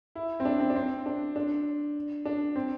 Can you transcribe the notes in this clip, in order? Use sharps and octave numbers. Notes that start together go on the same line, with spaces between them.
E4
C4
D4
C4
D4
C4
D4
D4
D4
C4